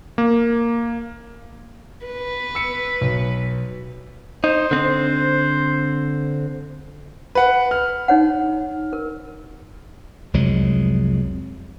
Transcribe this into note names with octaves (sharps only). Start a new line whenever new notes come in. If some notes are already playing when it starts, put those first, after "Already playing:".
A#3
B4
E6 C#7
B1
D#4 C5
D3 C4
B4 F#5
F6
D#4 C#5 F#5
A#4
C2 F2 F#3 G#3